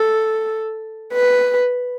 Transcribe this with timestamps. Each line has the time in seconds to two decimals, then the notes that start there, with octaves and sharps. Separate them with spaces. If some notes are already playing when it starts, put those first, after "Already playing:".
Already playing: A4
1.13 B4